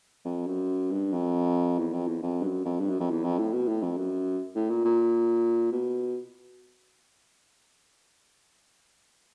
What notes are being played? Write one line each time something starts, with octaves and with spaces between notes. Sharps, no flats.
F2
F#2
G2
F2
E2
F2
E2
F2
G2
F#2
F2
G2
F#2
F2
E2
F2
A2
B2
A2
F2
F#2
A2
A#2
A#2
B2